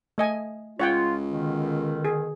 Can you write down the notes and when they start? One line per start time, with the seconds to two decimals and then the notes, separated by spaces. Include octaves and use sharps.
0.18 A3 D#5 G#5
0.80 C#2 F4 C#5 F#5 G5
1.32 B2 D3 D#3
2.05 G#4